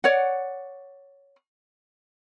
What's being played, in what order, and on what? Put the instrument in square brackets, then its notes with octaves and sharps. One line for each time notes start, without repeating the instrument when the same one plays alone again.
[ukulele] C#5 D5 F#5